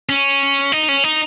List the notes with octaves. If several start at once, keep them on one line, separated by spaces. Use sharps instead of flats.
C#4
D#4
C#4
D#4